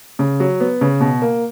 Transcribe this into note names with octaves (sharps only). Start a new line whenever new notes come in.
C#3
F#3
B3
C#3
B2
A#3